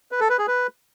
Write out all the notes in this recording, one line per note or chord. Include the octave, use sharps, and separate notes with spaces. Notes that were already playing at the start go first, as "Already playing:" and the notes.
B4
A4
B4
G#4
B4